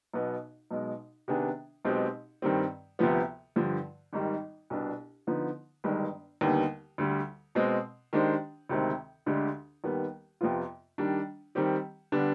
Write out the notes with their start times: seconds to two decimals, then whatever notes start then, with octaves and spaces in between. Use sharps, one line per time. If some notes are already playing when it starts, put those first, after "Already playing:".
0.14 B1 B2 B3
0.71 B1 B2 G#3
1.28 C3 D#3 B3 D4 G#4
1.85 B1 B2 G#3 C4 G4
2.42 G2 D#3 G3 C4
2.99 D2 C3 F3 B3
3.56 G2 D3 F3
4.13 G#1 G#2 D#3 G3
4.70 C2 B2 B3 D4
5.27 D3 F3 B3 D#4
5.84 G1 G2 D#3 G#3
6.41 D#2 D3 G3 B3 D#4
6.98 D2 D3 G3
7.55 B2 G#3 C4
8.13 D#3 G#3 D4 G4 C5
8.69 D2 C3 D#3 G#3 C4
9.26 D2 D3 G#3 D4 G4
9.84 D#2 D#3 G3 B3
10.41 F2 C3 F3 B3 F4
10.98 D#3 G3 D4
11.55 D#3 G3 C4 G4
12.12 D3 G3 B3 D4